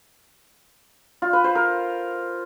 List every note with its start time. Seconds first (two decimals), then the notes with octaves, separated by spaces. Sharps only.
1.22 F4
1.33 B4
1.44 C5
1.55 A#4